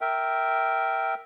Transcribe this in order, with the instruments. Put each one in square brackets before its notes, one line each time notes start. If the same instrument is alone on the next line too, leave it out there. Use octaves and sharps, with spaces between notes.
[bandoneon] A#4 E5 G5